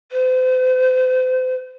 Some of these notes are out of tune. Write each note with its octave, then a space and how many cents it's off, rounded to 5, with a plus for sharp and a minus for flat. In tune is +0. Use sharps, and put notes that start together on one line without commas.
C5 -40